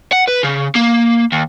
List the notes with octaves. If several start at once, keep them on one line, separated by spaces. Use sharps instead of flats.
F#5
B4
C#3
A#3
D#2